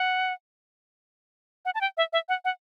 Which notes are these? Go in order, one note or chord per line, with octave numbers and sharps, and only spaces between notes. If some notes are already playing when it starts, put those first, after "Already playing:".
Already playing: F#5
F#5
A5
G5
E5
E5
F#5
F#5